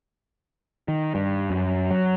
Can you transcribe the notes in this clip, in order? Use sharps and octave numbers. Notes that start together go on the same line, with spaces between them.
D#3
G2
F#2
F#3